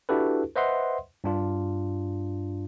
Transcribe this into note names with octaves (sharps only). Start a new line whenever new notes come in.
D4 E4 F#4 G4 A4 B4
B4 C5 D#5 E5 F#5 C6
G2 D4 F4